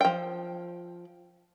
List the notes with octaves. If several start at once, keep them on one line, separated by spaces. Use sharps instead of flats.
F3 G5